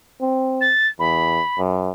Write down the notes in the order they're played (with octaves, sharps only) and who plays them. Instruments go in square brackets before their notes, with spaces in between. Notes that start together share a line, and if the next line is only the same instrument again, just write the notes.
[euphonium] C4
[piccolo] A6
[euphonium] E2 [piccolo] B5
[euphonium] F#2